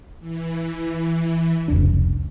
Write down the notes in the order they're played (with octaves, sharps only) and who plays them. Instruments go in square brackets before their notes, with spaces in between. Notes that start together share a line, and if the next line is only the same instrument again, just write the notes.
[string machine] E3
[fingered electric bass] F1 C#2 D4